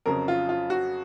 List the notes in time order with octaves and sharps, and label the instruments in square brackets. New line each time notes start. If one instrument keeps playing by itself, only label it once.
[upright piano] F2 C#3 F#3 A#4
F4
F4
F#4